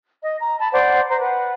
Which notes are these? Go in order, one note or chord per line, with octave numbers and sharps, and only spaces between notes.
D#5
A#5
A5 B5
C5 D5 F#5
C5 A#5
B4 F#5